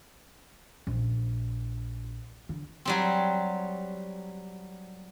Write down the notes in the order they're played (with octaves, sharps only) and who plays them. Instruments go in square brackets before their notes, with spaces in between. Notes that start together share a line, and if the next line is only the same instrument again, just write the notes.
[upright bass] A#1
D3
[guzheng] F#3 G3 C4